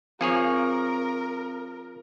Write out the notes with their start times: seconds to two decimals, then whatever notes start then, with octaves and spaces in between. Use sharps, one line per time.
0.21 F3 C4 G#4 A#4 C#5